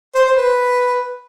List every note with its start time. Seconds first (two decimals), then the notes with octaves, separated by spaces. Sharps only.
0.15 C5
0.25 C5
0.36 B4